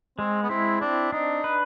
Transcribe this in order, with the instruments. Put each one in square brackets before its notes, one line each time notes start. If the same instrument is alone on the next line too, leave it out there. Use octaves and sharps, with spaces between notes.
[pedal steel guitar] G#3 [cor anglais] C4
[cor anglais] B3
[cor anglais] C4 [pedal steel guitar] E4
[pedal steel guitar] C4 [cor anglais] D4
[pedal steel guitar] D4 [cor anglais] D#4
[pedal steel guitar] B4